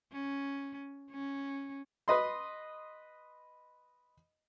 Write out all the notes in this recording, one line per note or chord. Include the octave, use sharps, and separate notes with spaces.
C#4
C#4
B4 D#5 C6